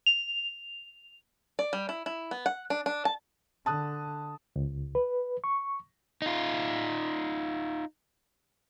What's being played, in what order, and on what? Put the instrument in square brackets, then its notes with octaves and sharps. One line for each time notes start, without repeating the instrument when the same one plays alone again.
[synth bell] F7
[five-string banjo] D5
G3
E4
E4
B3
F#5
D4
D4
A5
[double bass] D3 [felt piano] A5 D#6 F#6
[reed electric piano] C#2
B4
C#6
[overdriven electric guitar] D#4 F4